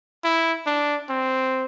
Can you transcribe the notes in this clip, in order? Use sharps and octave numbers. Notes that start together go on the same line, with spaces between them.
E4
D4
C4